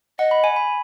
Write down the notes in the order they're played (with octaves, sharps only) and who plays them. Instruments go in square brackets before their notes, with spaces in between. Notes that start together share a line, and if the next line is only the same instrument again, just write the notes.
[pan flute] D#5 [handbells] F#5
[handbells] B5
G#5
B5